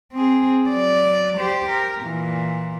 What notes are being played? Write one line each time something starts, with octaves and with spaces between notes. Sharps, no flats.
C4 G#4
F#3 D5
G4 C5
A#4
A#2 E3